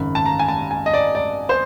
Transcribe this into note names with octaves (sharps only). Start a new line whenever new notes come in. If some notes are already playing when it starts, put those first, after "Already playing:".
Already playing: G#1 F#2 C#3 B5
A5
A#5
G#5
A5
G#5
D#5
D5
D5
C5